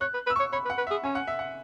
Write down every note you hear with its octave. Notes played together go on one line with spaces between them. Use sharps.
C#5 F#6
B4
B4
E6
C#6
C#5
C#5 B5
B4
F#5
B4
E5
G#4
C#4 G#5
F#5
E5
F#5